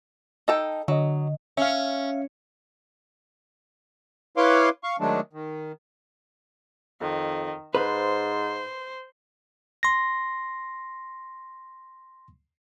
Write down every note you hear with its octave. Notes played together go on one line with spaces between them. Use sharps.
D#4 A4 G5
D3 F#3 D#5
C#4 E5 F5
E4 B4 C#5 F5 C6 D6
F5 C#6
D#3 F#3 G#3 A3 D4
D#3
F2 D#3
G#2 B4 C5
C6 A#6